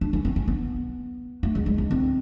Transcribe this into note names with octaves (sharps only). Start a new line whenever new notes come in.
D4
C#4
C4
C#4
B3
A3
G#3
G#3
C#4
C4